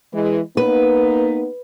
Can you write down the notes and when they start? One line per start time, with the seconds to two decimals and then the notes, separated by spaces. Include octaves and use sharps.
0.13 E3 G#3
0.57 A#3 B3 D#4 B4